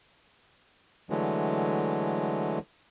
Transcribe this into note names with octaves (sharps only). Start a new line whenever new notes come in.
D3 E3 F#3 G#3 A3